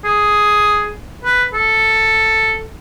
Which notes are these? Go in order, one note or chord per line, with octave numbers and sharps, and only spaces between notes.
G#4
B4
A4